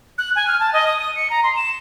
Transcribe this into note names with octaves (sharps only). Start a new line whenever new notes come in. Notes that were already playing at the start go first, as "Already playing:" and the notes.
F#6
G#5
F6
A5
D#5
D#6
D#7
C#7
A#5
C6
E7